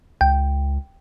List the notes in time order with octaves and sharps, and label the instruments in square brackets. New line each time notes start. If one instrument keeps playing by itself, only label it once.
[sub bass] C#2 [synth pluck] G5